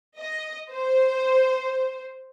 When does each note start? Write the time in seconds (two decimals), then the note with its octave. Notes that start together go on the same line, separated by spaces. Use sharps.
0.16 D#5
0.71 C5